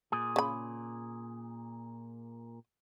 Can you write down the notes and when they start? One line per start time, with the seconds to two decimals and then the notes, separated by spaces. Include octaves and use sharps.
0.12 A#2 G#4
0.36 C#3 B5